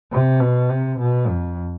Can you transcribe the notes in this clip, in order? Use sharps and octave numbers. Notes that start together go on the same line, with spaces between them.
C3
B2
C3
B2
F2